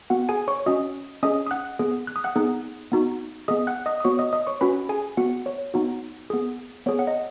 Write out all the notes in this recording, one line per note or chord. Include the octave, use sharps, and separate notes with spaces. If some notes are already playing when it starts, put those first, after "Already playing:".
B3 F#4 F#5
G#4 G#5
C#5 C#6
C#4 F#4 D#5 D#6
C#4 G#4 D#5 D#6
D#6
F#5 F#6
B3 G#4
F#6
D#6
F#5 F#6
B3 D#4 G#4
B3 D#4 F#4
B3 G#4 D#5 D#6
F#5 F#6
D#5 D#6
D#6
B3 F#4 C#5 C#6
D#5 D#6
D#5 D#6
C#5 C#6
C#4 F#4 B4 B5
G#4 G#5
B3 F#4 F#5
C#5
B3 D#4 F#4
B3 G#4
B3 G#4 C#5
F#5
D#5